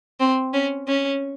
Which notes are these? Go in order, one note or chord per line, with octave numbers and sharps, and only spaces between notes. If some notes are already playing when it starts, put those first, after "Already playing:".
C4
C#4
C#4